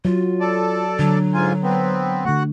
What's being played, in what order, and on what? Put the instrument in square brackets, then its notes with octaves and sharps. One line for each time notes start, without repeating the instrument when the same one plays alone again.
[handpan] F#3 [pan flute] F4
[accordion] A4 D5
[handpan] D3 [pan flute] F#3
[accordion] G#2 F4 G#5
B3 C4
[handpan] D3 A3 [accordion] F#4 F#5